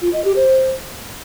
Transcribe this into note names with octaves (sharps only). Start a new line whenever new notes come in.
F4
D#5
G4
C5